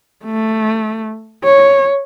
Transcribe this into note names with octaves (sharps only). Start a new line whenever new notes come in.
A3
C#5